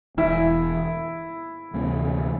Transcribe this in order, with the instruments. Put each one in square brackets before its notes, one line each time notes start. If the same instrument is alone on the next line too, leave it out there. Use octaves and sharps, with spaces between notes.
[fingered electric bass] E1 E2 E3 [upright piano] E4
[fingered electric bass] D2 C3 E3 A#3